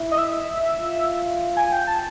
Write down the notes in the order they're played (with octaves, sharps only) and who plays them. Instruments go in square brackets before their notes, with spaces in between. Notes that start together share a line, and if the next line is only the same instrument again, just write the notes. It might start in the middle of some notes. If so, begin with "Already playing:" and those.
Already playing: [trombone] E4
[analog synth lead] D#5
E5
[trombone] F4
[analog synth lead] G#5
G5
A5